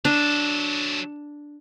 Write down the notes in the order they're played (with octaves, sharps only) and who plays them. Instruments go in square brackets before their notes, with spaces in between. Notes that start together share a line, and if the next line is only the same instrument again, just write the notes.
[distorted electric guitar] F#3 A4 [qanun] D4